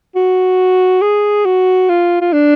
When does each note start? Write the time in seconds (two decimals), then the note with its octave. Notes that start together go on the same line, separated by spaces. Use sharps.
0.15 F#4
1.02 G#4
1.46 F#4
1.89 F4
2.21 F4
2.33 D4